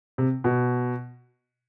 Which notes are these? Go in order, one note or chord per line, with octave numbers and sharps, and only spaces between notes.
C3
B2